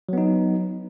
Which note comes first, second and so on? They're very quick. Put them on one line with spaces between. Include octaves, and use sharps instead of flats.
F#3 B3 D#4